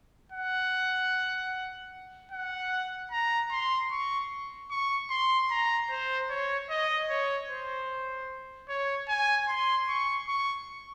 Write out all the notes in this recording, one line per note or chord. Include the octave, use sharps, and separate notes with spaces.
F#5
F#5
A#5
C6
C#6
C#6
C6
A#5
C5
C#5
D#5
C#5
C5
C#5
G#5
C6
C#6
C#6